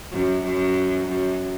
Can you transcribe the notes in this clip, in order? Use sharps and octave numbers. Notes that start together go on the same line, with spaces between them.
F#2
F#2
F#2